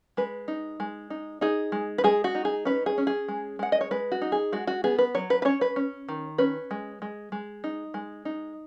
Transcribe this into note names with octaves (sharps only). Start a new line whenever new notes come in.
G#3 B4
D#4
G#3
D#4
D#4 G#4
G#3
B4
G#3 G#4
F#4
D#4
G#4
C#4 B4
G#4
C#4
G#4
G#3
G#3 F#5
D#5
C#5
G#3 B4
F#4
D#4
G#4
G#3 F#4
F#4
B3 G#4
B4
F#3 C#5
B4
B4
C#4 C#5
B4
C#4
D#3
C#4 B4
G#3
G#3
G#3
D#4
G#3
D#4